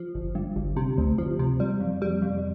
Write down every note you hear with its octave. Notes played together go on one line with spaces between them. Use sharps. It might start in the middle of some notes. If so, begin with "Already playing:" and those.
Already playing: F3
G1
G2
G1
C3
D2
F3
C3
G3
F2
G3
F2